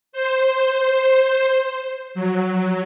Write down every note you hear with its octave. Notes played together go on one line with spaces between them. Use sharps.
C5
F#3